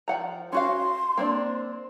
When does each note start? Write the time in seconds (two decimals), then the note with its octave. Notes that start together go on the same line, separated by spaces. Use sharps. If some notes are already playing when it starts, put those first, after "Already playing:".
0.08 F3 F#5 A#5
0.52 C#4 F#4 F5 C6
1.17 A#3 C4 D4